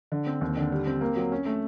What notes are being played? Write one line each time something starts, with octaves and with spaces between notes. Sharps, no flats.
D3
C4
D#2
D3
G3
C4
A#3
F#3
C#4
A3